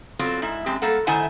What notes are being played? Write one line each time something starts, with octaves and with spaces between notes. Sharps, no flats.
F#3 B3 C4 F4 A4 D5
G#2 E4
F#2 G#3 C4 G4
G3 A#3 A4 F#5
D#3 A3 E4 C5 F#5 G#5